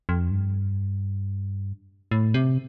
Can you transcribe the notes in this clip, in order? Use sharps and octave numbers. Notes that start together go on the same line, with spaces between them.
F2
G2
A2
C3